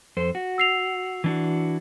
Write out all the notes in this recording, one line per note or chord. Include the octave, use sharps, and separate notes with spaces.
F2 A4 C5
F#4
E6 C7 F7
E3 D4 F#4